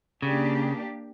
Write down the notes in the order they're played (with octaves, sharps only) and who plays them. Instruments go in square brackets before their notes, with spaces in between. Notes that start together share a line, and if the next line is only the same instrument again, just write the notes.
[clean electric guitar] C#3 [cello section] A#3 D4 G4